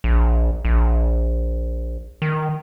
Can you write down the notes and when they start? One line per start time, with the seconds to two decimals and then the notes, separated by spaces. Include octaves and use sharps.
0.04 A#1
0.65 A#1
2.22 D#3